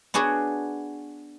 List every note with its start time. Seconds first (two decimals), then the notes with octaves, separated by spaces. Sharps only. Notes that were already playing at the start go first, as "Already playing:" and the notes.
0.14 B3 D4 F#4 G#4 C#5